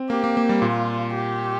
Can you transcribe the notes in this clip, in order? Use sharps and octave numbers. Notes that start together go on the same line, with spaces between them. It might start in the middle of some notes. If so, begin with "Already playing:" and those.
Already playing: C4
A#3 G4
A#3
A#3
G3
A#2 F4
G4